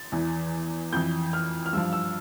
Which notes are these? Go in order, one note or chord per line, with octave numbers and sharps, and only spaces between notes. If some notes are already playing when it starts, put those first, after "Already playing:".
Already playing: A6
E2 E3
F2 E3 G6
F6
F6
G2 F3 E6
E6